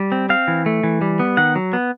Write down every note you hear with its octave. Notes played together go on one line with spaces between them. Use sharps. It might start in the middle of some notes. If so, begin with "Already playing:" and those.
Already playing: G3
C4
C4 F5
E3
A3
E3
G3
B3
D#3 F#5
F#3
B3